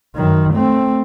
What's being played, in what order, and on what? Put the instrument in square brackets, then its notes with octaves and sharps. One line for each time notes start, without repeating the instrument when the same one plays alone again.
[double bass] F#2 D#3
A3 C4